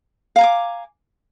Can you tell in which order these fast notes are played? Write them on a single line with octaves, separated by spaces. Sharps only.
F5 A#5 G#5 D6